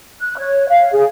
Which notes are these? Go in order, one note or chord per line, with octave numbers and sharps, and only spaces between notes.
F#6
C#5
F5
G#4